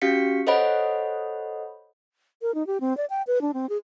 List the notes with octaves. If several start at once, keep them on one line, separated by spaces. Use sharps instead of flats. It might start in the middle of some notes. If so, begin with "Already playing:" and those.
C#4 F#4 G4 F5 B6 C#7
A4 C5 C#5 D#5 F#5 B5
A#4
D#4
G4
C4
D5
G5
B4
D4
C4
G#4